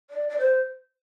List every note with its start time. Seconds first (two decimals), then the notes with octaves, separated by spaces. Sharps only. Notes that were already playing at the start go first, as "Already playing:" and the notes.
0.10 D5
0.29 D5
0.38 C5